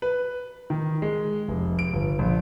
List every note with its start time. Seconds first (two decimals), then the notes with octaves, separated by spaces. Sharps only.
0.02 B4
0.70 D#3
1.02 G#3
1.48 F1
1.79 D7
1.93 G1
2.19 A#1